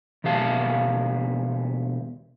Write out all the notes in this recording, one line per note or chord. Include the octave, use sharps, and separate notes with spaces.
D#2 B2 G4 F5 A5